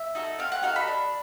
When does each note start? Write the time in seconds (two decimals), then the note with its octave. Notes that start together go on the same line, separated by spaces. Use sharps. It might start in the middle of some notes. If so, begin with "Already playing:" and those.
Already playing: E5
0.15 D#4 F#4 A4
0.39 C4 F5
0.52 F#5
0.63 D#4 F#4 A4 F5
0.76 B5
0.87 D4